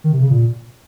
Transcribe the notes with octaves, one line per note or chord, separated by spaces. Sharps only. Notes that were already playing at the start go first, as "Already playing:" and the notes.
D#3
C3
C#3
A#2